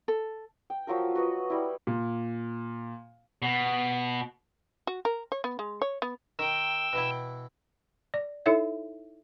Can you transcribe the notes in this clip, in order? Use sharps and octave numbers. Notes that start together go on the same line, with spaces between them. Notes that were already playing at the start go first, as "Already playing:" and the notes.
A4
G5
F3 F#3 F4 A#4
F#4 B4 D#5
G3 E4
A#2
B2
F#4
A#4
C#5
B3
G#3
C#5
B3
D#3 G5 E6
B2 E3 E4
D5
D#4 E4 A4 C#5 E5